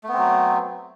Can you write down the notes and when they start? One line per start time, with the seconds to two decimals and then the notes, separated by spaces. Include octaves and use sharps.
0.04 A3
0.08 B3
0.13 C4
0.18 F#3